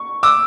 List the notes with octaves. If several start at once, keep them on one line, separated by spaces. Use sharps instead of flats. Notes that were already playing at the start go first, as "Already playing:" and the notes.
Already playing: C#6
D6 E6